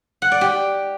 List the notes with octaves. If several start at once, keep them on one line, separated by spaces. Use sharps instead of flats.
F#5
D5
G4